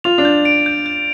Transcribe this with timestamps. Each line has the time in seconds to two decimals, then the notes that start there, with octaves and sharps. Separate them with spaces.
0.04 F4 F7
0.18 D4
0.25 G6
0.45 D7
0.66 G6
0.86 G6